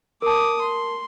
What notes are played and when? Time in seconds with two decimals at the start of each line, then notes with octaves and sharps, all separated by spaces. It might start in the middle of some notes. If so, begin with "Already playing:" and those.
0.22 A#4 A5 D6 D#6
0.61 C6